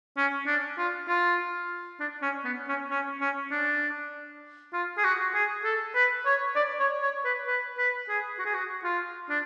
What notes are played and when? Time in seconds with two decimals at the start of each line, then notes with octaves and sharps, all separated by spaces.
0.17 C#4
0.46 D4
0.78 F4
1.08 F4
2.00 D4
2.22 C#4
2.45 B3
2.68 C#4
2.91 C#4
3.21 C#4
3.51 D4
4.73 F4
4.98 G#4
5.04 F#4
5.34 G#4
5.64 A4
5.95 B4
6.26 C#5
6.56 D5
6.79 C#5
7.02 C#5
7.25 B4
7.48 B4
7.78 B4
8.09 G#4
8.39 F#4
8.46 G#4
8.54 F#4
8.84 F4
9.29 D4